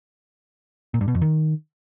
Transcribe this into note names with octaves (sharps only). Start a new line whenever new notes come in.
A#2
G2
B2
F2
D#3